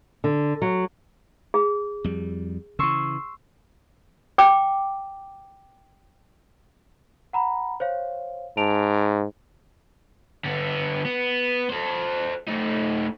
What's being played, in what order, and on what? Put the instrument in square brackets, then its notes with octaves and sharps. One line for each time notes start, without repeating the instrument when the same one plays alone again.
[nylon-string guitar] D3
F#3
[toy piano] G#4
[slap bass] F2 G3
[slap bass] C#3 E3 [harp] C6 C#6 E6
[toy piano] G5 D6
[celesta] F#5 A#5 B5
C5 C#5 F5
[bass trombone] G#2 [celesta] A5 D7 F7
[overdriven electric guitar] D3 B3
B3
A4 C5
A3 D#4